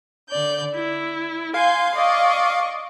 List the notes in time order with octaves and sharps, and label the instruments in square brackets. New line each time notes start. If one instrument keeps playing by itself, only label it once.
[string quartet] D3 D5 G6
E4
[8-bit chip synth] F5 [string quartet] G#5 C6 G6
[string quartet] D5 D#5 C#6